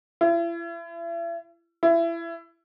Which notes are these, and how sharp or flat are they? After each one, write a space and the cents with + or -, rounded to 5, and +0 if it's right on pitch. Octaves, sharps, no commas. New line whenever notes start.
E4 +40
E4 +25